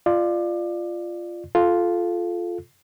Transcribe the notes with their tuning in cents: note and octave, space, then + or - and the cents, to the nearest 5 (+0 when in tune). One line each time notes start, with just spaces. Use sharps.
F4 -10 D5 +25
F4 +0 A4 -20